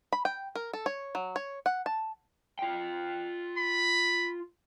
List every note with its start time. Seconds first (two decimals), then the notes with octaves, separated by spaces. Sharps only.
0.13 B5
0.25 G5
0.55 A#4
0.73 A4
0.86 C#5
1.15 F#3
1.36 C#5
1.66 F#5
1.86 A5
2.59 F4 G5
3.58 B5